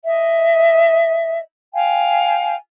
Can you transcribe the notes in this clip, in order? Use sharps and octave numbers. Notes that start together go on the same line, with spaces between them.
D#5 E5
F5 G5 G#5